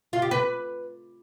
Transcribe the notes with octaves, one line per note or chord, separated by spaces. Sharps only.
F4
G4
B4